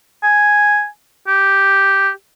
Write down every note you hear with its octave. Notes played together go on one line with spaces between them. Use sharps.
G#5
G4